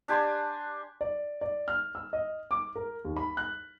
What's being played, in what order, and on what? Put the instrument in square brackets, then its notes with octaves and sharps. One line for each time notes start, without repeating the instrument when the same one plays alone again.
[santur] D4 G4 G#5 C6
[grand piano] D5
D5
F6
E6
D#5
D6
A#4
D#2
B5
F#6